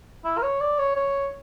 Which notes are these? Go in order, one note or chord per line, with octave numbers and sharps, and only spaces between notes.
E4
A#4
C#5
D5
C#5
C#5